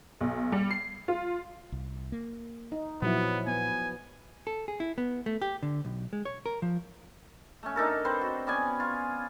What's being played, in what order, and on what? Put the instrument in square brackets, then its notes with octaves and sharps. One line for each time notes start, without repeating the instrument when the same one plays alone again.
[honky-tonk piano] B1
G3
C7
F4
[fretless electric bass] C2
A#3
[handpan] D#4
[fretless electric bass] A#2 [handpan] F3 F#3 E4 [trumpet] B3
[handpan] B3 [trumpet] G#5
[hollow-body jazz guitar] A4
G#4
E4
B3
A3
G4
D3
B1
G#3
C#5
A#4
F3
[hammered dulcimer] A3 C#4
D4 D#4 A4 A#4
C4 B4 C5
F#4
B3 C#4 D5 G#5
F4